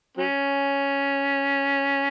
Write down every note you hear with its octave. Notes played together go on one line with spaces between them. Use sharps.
F#3 C#4